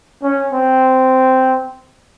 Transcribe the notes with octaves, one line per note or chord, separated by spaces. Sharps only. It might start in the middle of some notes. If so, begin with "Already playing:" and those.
C#4
C4